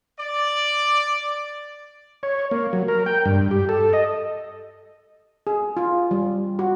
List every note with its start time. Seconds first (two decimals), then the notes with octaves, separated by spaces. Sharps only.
0.20 D5
2.23 C#5
2.51 A#3
2.73 F#3
2.88 A#4
3.06 G5
3.25 G2
3.51 G4
3.69 A4
3.93 D#5
5.47 G#4
5.77 F4
6.11 G3
6.59 F#4